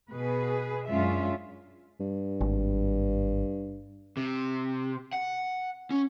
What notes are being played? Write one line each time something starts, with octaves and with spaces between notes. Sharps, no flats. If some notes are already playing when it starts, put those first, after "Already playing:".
B2 G#4 B4
F#2 G#3 C#4 D4 F4 E5
G2
G#1
C3
F#5
C#4